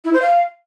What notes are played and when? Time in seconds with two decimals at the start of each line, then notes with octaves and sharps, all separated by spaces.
0.05 E4
0.13 C5
0.22 F5